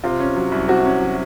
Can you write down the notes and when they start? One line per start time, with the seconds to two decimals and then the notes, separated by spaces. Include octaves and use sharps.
0.04 C3 F4
0.20 C#4
0.36 F#3
0.52 C2
0.68 C3 F#4
0.85 C#4
1.02 F#3